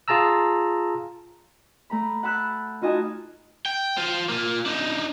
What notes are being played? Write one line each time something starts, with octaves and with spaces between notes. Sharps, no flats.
F4 G#4 A5 A#5 E6
A3 A#5 B5
F#5 A5 B5 E6 F#6 G6
D#4 F4 F#4 D#5 G#5 A5
G5
F4 C5
A#3 F4
D4 D#4